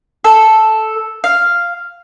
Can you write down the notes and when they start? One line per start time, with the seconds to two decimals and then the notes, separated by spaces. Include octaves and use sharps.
0.24 A4
1.24 F5